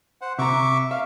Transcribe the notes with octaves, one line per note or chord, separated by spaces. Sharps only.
C5 F#5
C3 E5 A#5 C#6 D6
E5 F5